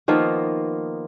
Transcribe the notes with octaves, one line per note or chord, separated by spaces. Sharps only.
D#3 F3 A#3 B3